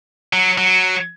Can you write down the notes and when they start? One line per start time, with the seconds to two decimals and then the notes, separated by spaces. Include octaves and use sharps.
0.33 F#3
0.58 F#3